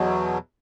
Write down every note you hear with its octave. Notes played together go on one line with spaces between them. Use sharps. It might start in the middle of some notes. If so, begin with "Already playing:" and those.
Already playing: E2 B2 F#3